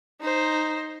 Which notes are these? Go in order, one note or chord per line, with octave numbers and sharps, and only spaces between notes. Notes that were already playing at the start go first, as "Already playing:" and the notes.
D#4 C5